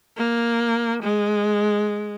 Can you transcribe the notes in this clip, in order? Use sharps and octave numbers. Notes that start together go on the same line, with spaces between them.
A#3
G#3